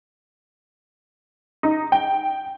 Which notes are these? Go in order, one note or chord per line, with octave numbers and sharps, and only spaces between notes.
D#4
G5